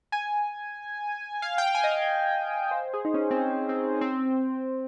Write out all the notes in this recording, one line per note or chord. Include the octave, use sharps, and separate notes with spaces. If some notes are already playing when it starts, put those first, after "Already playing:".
G#5
F5
G5
G#5
D#5
F5
C5
G#4
D#4
C#4
C4
C#4
C4
C4